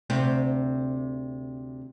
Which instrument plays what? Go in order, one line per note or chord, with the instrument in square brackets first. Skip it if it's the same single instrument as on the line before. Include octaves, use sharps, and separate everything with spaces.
[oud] D2 C3 C4